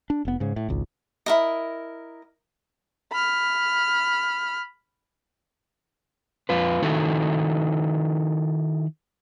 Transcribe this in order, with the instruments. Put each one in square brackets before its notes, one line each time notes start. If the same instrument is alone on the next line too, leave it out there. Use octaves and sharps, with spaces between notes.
[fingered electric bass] D4
F1 B3
G#2 C#3
A2
G#1 C#2
[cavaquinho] E4 A#4 D#5
[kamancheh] B5 F6
[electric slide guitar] F2 F4 B4
D#3 D#4 E4 F#4 A4